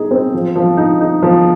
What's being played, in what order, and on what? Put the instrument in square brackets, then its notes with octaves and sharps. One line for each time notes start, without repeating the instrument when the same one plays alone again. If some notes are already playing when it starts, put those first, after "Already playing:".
Already playing: [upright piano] D#4 G#4
C4
F3
F3
D#4
D#4
F3